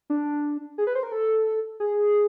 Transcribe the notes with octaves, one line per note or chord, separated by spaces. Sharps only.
D4
G#4
B4
C5
A#4
A4
G#4